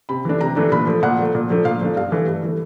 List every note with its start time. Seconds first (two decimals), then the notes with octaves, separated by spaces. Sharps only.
0.09 C3 B5
0.25 E3 A3 D4
0.41 C3 A#5
0.56 E3 A3 D4
0.72 A#2 B5
0.87 F3 A3
1.03 A#2 F#5
1.18 F3 A3
1.35 A#2
1.50 F3 A3 D4
1.65 A#2 F5
1.81 F3 A3 D4
1.97 G2 F5
2.12 E3 A3
2.27 G2
2.43 E3 A3